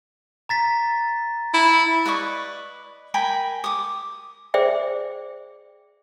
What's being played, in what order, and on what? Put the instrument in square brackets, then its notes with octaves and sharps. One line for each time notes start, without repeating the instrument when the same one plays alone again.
[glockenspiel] A#5 A6 B6
[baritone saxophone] E4
[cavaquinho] B4 D5 D#5 C#6
A#4 G5 G#5 B5
D6 D#6
[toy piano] G#4 C5 D5 E5 G5